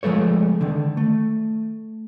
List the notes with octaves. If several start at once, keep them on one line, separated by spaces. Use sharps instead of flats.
F3 G#3 A3 A4 C#5
D3 D#3
A3